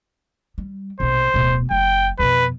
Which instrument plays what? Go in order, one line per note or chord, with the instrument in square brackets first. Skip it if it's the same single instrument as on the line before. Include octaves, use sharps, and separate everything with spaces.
[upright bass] G3
[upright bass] A#1 B2 [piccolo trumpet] C5
[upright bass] D1 B2
[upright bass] F#1 [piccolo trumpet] G5
[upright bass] F2 B2 [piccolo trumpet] B4